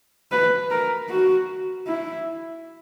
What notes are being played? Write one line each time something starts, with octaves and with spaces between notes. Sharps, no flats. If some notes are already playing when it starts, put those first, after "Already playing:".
B4
A#4
F#4
E4